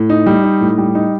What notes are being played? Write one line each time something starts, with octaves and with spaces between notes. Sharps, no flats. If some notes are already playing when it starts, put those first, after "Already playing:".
Already playing: A2
D#4
G3
D#4
A2
G3
D#4